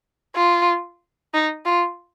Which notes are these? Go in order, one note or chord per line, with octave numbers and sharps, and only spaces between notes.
F4
D#4
F4